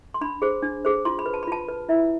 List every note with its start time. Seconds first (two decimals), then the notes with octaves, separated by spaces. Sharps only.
0.14 C6
0.21 D4 B5
0.42 G#4 C5
0.63 D4
0.85 G#4 C5
1.05 F4 C6
1.19 B5
1.26 B4
1.34 A5
1.43 B5
1.48 F4 A5
1.68 B4
1.89 E4 E5